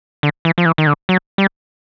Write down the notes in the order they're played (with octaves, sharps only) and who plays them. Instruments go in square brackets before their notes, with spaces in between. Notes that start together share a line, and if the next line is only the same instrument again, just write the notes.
[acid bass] D3
E3
F3
E3
D#3
D3
F#3
G3